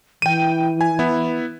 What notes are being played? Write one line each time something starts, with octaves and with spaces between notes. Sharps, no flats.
E3 G5 D#7
G#5
B3 E4